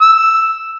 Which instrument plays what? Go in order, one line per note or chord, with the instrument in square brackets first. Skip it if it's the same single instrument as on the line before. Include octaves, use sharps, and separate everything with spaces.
[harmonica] E6